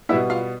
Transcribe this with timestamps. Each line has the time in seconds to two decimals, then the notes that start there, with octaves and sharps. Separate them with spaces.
0.09 B2 G3 B3 E4 E5
0.30 F4 F5